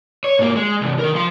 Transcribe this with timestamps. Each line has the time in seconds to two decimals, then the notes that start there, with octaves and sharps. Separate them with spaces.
0.24 C#5
0.39 G#2 A#3
0.56 G#3
0.81 C2 E3
0.99 D#3 A#4
1.15 F3 C6